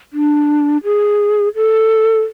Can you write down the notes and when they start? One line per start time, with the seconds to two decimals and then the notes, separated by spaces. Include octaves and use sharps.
0.13 D4
0.84 G#4
1.56 A4